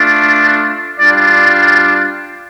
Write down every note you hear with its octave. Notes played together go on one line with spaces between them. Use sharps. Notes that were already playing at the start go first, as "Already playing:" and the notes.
Already playing: A3 D4 F4
G3 D4 F4 D5